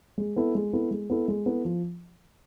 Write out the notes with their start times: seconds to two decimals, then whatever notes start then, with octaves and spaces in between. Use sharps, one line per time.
0.18 G#3
0.36 B3 E4 A4
0.55 G#3
0.73 B3 E4 A4
0.91 G#3
1.10 B3 E4 A4
1.28 G#3
1.46 B3 E4 A4
1.65 F3